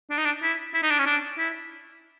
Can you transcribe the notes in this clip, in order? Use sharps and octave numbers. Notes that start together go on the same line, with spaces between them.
D4
D#4
D4
E4
E4
D#4
D4
C#4
D4
E4